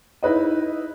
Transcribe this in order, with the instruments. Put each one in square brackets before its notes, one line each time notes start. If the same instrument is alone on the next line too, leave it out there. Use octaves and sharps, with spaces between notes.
[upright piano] D#4 E4 B4 D#5